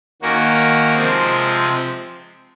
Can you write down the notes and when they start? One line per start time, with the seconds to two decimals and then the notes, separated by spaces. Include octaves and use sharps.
0.22 D#3 A#3 C#4 F#4 A#4
0.95 C3 F3 G#3 C4